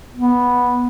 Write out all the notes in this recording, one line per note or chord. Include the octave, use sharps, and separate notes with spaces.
B3